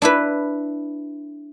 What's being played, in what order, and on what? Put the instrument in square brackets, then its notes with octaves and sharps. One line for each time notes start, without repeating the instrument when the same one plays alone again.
[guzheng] D4 E4 B4